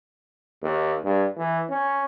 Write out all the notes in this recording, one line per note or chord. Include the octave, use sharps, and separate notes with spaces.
D#2
G2
E3
C#4